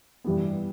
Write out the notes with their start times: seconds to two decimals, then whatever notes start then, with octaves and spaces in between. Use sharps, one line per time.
0.24 G2 E3 G3 B3